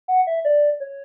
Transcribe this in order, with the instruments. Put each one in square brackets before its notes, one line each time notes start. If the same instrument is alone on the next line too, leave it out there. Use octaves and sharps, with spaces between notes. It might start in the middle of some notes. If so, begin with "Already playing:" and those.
[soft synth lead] F#5
E5
D5
C#5